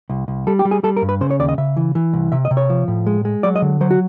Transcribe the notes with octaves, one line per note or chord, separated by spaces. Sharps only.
C2
C2
G3 A4
G4
G3
G#4
G3 A4
A#4
G2
B4
C#3 C5
C#5
D#2 D5
D#5
C#3 E5
E3
E3
C2
C3 E5
D#5
C3
C#5
F3
A2
G#3
G#3
F#3 D5
D#5
D3
F#3 C5
F#4